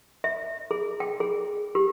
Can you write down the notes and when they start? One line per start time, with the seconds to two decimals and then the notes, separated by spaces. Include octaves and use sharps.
0.24 E5
0.71 G#4
1.00 G5
1.20 G#4
1.75 G4